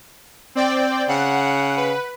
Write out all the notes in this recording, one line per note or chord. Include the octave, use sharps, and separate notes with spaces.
C4 D5 G5
C#3 F#5
B4